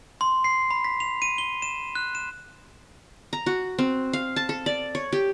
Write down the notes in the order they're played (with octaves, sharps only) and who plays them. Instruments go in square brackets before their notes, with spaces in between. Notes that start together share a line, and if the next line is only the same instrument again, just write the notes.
[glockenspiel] C6
C7
B5
B6
F7
D#7
G7
E7
F#6
E7
[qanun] A#5
F#4
C4
F5
A5
A4
D5
C#5
G4